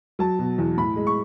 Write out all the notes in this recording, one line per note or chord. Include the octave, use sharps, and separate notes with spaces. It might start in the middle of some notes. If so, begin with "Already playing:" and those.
F#3 A5
B2
E2
A2 B5
G#3
C#6